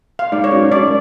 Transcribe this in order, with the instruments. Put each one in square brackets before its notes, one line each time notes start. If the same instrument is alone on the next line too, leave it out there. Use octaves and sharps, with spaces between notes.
[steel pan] F5
[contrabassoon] G#2 [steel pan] D5
[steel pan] C#5
[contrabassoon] F#2 [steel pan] D5
[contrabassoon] G#2
[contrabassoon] F#2 [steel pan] D5